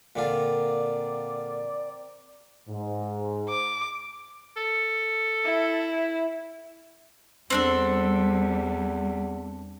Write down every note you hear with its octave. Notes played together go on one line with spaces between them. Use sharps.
A#2 D3 C4 F4 A#4 D5
G#2
D6
A4
E4
E2 G3 C4 D4 A4